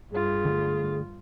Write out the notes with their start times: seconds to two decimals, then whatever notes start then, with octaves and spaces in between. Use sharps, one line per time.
0.12 G2 F4 G#4
0.45 D3 G3 A3